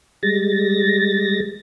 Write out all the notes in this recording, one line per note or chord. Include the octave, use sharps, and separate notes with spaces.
G3 G#3 A6 A#6